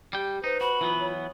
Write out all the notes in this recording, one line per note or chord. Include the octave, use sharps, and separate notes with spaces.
G3 G4 G5
D#4 B4 C5
F#4 B5
E3 F#3 B3 F4
C#5